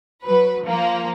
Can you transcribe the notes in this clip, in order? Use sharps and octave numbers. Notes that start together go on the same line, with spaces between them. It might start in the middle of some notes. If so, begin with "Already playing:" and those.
F#3 B4
F3 A#3